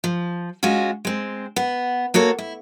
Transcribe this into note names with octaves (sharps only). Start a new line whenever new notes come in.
F3
G#3 C#4 F4 F#4
G#3 C4
B3
A#3 F#4 A4 C#5
E4